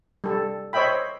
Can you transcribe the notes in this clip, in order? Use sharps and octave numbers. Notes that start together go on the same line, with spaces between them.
G3 A4
C5 C#5 D#5 E5 G5 B5